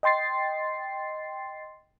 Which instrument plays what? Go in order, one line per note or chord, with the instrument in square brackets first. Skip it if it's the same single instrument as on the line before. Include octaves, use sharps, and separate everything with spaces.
[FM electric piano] D#5 G5 C6 A6 C7